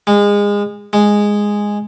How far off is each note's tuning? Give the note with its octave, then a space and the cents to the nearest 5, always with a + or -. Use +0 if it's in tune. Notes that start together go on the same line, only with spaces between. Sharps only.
G#3 -25
G#3 -5